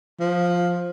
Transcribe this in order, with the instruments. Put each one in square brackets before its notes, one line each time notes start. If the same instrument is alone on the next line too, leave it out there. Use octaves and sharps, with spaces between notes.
[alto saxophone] F3